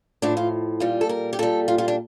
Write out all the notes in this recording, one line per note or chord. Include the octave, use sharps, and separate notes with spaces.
A2 F3 D4
F4
A#2 G3 F4
A4
A#4
G4
A#2 G3 A4
F4
F4
D4